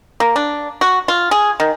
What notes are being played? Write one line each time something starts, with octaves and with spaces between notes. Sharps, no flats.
A#3
D4
F#4
F4
G#4
D#3